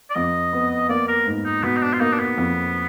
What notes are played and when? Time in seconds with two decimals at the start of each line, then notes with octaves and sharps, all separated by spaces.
0.10 D5
0.15 F2 D#5
0.53 B3
0.89 A#3 D5
1.08 A#4
1.27 G#2
1.45 D#4
1.63 B2 B3
1.77 D#4
1.83 D4
1.93 F4
2.00 A#3 D#4
2.13 D4
2.20 B3
2.38 F2